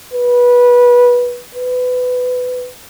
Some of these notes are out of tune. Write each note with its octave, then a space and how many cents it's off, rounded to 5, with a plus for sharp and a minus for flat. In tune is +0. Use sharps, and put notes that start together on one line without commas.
B4 -20
B4 +20